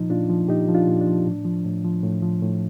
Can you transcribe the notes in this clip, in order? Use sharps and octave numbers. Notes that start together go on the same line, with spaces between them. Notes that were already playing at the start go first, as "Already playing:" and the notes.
Already playing: A#2 F3 D#4
A#2 D4 F4
F3
A#2 D#4 G4
F3
D4 F4
A#2
D4
F3
A2
F3
A2
F3
A2
F3
A2